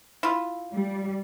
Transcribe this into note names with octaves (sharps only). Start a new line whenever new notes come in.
E4 F4
G3